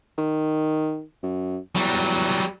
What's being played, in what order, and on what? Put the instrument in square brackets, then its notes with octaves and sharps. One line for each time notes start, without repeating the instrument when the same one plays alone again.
[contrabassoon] D#3
F#2
[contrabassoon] E2 [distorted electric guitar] F#3 G3